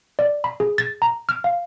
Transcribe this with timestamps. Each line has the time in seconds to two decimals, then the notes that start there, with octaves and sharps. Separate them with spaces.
0.19 D5
0.44 B5
0.60 G#4
0.78 A6
1.02 A#5
1.29 F6
1.44 F5